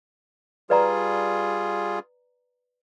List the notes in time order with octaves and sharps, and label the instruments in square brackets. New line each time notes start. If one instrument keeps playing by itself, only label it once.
[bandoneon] G3 F4 G#4 [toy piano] B4 D5 A#5